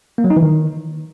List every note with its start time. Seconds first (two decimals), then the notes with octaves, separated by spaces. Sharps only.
0.18 A#3
0.24 F#3
0.30 D#4
0.36 E3
0.43 D#3